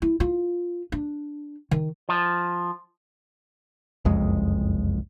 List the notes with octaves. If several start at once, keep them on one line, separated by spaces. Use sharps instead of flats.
E4
F4
D4
D#3
F3
F#1 C2 F2 G#3